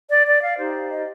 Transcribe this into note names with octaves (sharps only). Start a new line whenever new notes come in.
D5
D5
F5
D#4 G4 C5
D#5